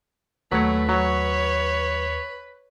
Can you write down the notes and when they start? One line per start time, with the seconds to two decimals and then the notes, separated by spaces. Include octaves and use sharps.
0.52 D#2 F#3 A3 B4 C#5
0.89 F#3 C#5